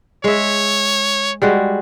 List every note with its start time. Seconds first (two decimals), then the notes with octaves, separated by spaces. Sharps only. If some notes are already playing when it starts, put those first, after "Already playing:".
0.24 G#3 C#5 E5
1.42 G3 G#3 F#4